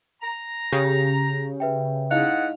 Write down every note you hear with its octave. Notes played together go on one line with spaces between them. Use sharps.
A#5
C#3 G4
B4 E5 G5
G#2 D#4 E4 D#5 F5 F#5